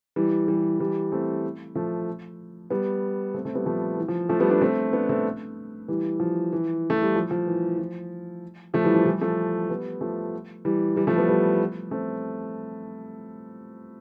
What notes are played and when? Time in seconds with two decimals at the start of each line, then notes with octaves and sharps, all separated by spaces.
0.16 E3 G3
0.48 E3 G3
0.80 E3 G3
1.12 A3 C4
1.75 F3 A3
2.70 G3 B3
3.34 A3 C4
3.45 A3 C4
3.55 G3 B3
3.66 F3 A3
3.98 E3
4.08 F3
4.29 F3 A3
4.40 G3 B3
4.51 B3 D4
4.61 A3 C4
4.93 B3 D4
5.09 A3 C4
5.88 E3 G3
6.20 F3
6.53 E3
6.90 A3
7.02 G3
7.16 F3
7.31 F3
7.47 E3
7.79 F3
8.74 F3 A3
8.84 E3 G3
8.95 F3
9.06 E3 G3
9.21 F3 A3
9.69 G3 B3
10.01 F3 A3
10.65 E3 G3
10.96 E3 G3
11.07 F3 A3
11.18 G3 B3
11.29 G3 B3
11.91 A3 C4